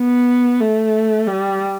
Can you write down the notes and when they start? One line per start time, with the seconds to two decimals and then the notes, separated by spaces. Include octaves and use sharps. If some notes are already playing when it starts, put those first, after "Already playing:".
Already playing: B3
0.60 A3
1.27 G3